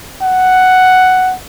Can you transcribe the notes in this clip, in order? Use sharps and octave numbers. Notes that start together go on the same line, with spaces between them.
F#5